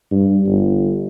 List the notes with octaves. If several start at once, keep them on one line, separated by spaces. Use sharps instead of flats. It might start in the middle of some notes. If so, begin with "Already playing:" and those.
G2
G1